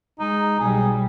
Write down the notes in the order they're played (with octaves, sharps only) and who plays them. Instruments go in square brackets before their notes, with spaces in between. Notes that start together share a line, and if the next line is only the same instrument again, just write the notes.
[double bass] G#3 [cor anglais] D#4
[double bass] B1 G3 [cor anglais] G#4